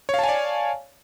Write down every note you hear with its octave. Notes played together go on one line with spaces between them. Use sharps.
C#5 D5 F5 G#5 A5